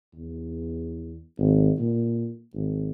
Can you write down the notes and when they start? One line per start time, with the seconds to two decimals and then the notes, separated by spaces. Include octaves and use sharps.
0.15 E2
1.38 G#1
1.79 A#2
2.54 G#1